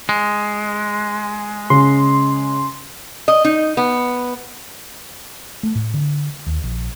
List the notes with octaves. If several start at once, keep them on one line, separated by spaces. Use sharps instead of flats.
G#3
C#3 C6
D#5
D#4
B3
A3
A2
D3
D#2
A#1